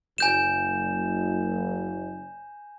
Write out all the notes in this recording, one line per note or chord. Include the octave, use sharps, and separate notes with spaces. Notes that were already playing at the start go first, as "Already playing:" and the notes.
F#1 G#5 G6 E7